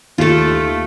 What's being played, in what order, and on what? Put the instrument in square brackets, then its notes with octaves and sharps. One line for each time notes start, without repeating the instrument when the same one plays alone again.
[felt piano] D#2 [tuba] D#3 [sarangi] A3 [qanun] F4 A4